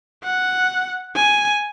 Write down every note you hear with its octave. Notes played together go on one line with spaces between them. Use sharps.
F#5
G#5